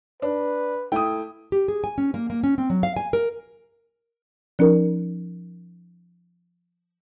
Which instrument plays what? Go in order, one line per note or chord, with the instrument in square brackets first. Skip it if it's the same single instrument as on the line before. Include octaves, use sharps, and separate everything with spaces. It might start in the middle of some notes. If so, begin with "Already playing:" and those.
[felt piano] D4 [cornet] B4
[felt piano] A3 E4 [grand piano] G5 D#6
[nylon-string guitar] G4
G#4
G#5
C#4
A#3
A#3
C#4
C4
F#3
F5
G#5
A#4
[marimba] F3 C#4 D#4 A#4